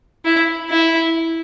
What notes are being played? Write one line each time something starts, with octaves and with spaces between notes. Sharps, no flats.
E4
E4